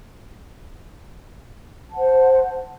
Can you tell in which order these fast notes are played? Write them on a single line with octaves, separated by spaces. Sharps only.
A5 F#5 C5